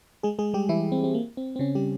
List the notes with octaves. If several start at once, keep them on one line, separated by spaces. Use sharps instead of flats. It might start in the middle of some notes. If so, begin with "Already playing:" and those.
G#3 G#4
G#3 G#4
G3 G4
E3 E4
C4
C4
A#3
C4
C4
C#3 C#4
G3 G4